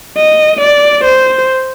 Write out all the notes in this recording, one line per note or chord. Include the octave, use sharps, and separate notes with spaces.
D#5
D5
C5